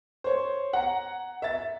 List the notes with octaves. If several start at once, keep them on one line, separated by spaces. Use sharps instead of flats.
C5 C#5
F#5 A#5 C#7
E5 A6